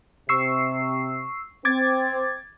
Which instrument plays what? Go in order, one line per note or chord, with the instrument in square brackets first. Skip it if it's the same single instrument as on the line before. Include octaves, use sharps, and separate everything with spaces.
[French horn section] C3 [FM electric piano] C#6 E6 C7
[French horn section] C4 [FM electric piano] D6 G#6 A6